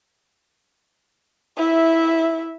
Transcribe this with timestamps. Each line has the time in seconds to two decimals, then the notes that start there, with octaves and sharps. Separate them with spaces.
1.58 E4 E5